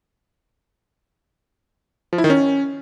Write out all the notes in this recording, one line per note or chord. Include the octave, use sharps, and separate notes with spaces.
F3
E4
D#3
C#4